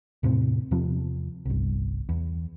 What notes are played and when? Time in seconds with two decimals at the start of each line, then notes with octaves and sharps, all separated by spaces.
0.23 E2 A2 C3 C4
0.71 E2 C3 F3
1.45 G1 C2
2.09 E2